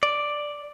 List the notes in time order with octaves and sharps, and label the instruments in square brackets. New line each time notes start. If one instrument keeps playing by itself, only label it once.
[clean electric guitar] D5